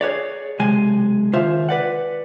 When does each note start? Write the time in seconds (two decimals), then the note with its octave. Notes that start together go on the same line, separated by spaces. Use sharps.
0.01 G#4 B4 C#5 D5
0.59 B1 C3 G#3 G#5
1.33 D#2 C#3 F4 C5 E5
1.69 B4 D5 F#5